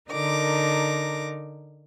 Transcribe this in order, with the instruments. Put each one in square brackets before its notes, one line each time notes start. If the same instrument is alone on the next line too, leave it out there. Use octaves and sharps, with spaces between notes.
[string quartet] D3 D#4 A#4 D6 A#6